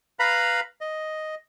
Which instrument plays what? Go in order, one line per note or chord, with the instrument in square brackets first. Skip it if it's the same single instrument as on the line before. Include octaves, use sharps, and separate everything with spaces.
[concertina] B4 F5 A#5 B5
D#5